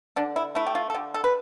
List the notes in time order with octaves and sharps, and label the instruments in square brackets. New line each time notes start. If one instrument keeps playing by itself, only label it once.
[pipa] D3 D4
E4
A3 E4
G4
F4
A4
D3 G4
A4
B4